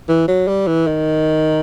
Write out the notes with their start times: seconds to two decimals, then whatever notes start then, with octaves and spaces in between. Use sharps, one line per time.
0.08 E3
0.28 F#3
0.48 G3
0.67 E3
0.87 D#3